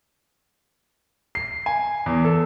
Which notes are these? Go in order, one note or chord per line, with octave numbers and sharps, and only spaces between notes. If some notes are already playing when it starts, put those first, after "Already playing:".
C7
G#5
E2
A4